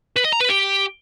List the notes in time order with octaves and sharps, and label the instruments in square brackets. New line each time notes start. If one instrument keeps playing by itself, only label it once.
[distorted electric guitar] B4
D#5
A#5
B4
G4